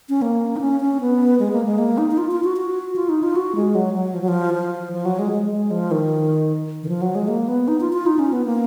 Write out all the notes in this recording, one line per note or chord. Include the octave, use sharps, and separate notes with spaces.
C#4
A#3
D#4
C#4
C#4
B3
G#3
A#3
G#3
A#3
D#4
D#4
F4
F4
F#4
F#4
F4
D#4
F4
F#4
G#3
F#3
F#3
F3
F#3
F3
F3
F3
F#3
G#3
G#3
G#3
F3
D#3
D#3
F3
F#3
G#3
A#3
B3
D#4
F4
F4
D#4
C#4
B3
A#3